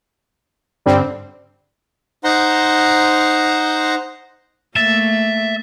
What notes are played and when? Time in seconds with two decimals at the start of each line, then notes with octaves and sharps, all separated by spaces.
0.86 G2 D3 G3 C4
2.24 D#4 C5 F#5 A#5 C6
4.76 A3 A#3 E5 A6